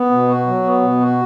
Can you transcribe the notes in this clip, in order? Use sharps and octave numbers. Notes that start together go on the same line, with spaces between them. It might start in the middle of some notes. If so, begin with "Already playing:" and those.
Already playing: B3
B2
F#4
F#3
B3
B2
F#4